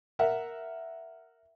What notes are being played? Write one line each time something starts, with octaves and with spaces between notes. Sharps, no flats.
A#4 E5 F#5